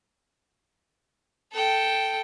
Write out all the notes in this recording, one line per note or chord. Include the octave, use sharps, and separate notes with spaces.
A4 G5